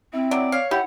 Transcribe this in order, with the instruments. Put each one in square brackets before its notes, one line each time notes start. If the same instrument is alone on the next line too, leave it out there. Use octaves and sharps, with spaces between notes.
[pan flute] C4 [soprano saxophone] E4
[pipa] F#3 [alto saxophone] D5
[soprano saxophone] C#5 [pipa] F5
[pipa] E4 [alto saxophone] G4 [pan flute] F#5